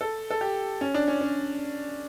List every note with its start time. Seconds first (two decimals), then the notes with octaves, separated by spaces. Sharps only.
0.01 A4
0.31 A4
0.41 G4
0.81 C#4
0.94 D4
1.08 C#4
1.21 C#4